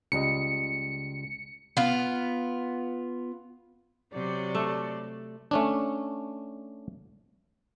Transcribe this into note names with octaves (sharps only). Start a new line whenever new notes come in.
C#2 G3 D#5 C#7
B3 F4
C3 F#3 D5
A3
A3 C#4 D4